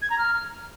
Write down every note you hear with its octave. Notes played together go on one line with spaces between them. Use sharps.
G#6
A#5
F6